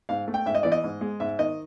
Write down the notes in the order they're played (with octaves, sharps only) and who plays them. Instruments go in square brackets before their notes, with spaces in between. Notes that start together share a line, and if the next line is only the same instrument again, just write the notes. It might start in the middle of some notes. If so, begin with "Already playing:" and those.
[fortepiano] G#2 F5
A3
G5
G#2 E5
D#5
E3 D5
D#5
G#2
G#3
G#2 E5
D#3 D#5